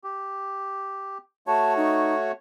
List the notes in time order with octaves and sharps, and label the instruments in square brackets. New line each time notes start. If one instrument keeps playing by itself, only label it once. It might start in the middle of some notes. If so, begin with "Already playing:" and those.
[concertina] G4
[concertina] A3 F#4 C#5 [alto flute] A5
[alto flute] D#4